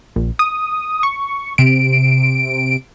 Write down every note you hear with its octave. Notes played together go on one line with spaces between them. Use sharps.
A#1
D#6
C#6
C3 D7